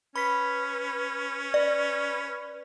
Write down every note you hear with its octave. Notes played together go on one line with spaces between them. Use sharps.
C#4 B4 B5 B6
B4 D5